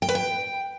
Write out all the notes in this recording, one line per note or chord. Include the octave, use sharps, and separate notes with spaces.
G5
B4
G5